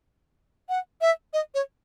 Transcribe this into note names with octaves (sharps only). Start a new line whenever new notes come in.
F#5
E5
D#5
C#5